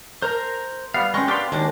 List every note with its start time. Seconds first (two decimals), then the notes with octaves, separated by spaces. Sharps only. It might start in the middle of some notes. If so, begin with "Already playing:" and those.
0.22 A#4 C5 A#5
0.94 G3 B3 F5
1.14 G#3 C#4 G5 C#6
1.28 B3 D4 G4 F5 G5 C6
1.52 D#2 G#3 D4 F#4 G4